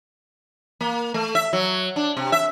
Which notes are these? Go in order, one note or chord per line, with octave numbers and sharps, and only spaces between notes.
A#3
A3
E5
F#3
D4
C3
E5